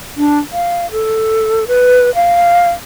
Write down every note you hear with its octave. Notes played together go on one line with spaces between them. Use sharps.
D4
F5
A4
B4
F5